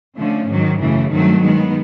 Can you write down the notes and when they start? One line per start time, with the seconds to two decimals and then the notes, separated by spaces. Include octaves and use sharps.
0.16 D3 F3 A3 C#4
0.48 G#2 D#3 F#3
0.79 F#2 C#3 E3 A3
1.11 G2 D#3 F#3 A3 C4
1.42 D#3 G#3 B3